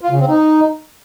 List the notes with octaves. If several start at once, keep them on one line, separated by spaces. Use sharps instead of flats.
F4
C#3
C4
D#4